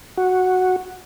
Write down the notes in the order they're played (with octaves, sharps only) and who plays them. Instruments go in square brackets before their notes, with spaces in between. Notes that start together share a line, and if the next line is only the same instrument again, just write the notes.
[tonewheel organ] F#4